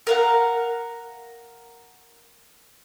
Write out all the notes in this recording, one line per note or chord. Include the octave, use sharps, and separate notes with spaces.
A#4 F5 F#5